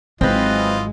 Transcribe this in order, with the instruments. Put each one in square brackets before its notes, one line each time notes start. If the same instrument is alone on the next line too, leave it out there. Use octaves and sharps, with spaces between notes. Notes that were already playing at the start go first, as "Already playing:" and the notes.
[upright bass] G#1 [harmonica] E3 F4 D#5 [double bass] F#3 G#3 [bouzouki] C4 B4